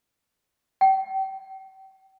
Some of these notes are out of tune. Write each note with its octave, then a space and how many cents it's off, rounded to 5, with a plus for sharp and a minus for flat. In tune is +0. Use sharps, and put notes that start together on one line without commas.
G5 -35